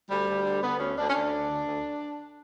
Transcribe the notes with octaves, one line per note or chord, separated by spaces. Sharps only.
D2 G3
D2
D3
D3 B3
D2 C#4
D2 D4
C#4
D2 D4
D3
D2
D2